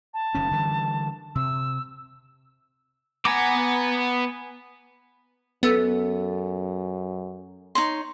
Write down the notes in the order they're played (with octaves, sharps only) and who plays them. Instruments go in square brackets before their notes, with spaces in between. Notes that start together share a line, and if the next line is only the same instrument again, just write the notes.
[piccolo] A5
[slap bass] F#1 D#3 C#4
D3 E3 G3
[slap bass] C3 [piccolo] E6
[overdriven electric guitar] B3 F#5 [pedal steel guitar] G#5 A#5 D6
[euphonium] F#2 [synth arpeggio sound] B3 [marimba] A4 E6
[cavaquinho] D#4 C#5 C6